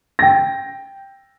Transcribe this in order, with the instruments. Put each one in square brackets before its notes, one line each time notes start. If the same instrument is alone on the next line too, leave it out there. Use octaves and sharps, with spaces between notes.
[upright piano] G5 A#6